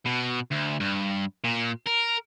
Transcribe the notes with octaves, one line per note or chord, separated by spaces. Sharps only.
B2
D2
G2
A#2
A#4